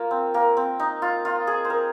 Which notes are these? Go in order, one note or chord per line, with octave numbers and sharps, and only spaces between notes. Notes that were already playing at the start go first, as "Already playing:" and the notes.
Already playing: A#3 F4
C4
A#3
C4
D#4
F4
F4
G#4
C5
A#4